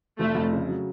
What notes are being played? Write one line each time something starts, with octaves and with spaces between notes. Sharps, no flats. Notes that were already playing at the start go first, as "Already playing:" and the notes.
F1 A3
F2
C#3
F#3